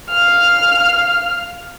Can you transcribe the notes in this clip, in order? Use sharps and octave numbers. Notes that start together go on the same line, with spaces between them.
F5 F6